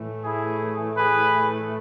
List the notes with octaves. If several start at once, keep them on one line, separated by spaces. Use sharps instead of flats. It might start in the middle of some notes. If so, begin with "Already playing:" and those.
Already playing: A2 E3 A3
E4 G#4
G#4 B4